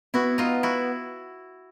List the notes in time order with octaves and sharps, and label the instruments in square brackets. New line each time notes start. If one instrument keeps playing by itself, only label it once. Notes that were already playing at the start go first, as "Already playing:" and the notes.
[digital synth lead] B3 [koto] E4 F#4
[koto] D#4 F4
E4 F#4